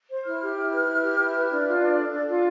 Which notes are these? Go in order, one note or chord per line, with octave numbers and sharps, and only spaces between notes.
C5
E4 F6
G4
E4
B4
E4
G4
E4
B4
D4
F4
D4
A4
D4
F4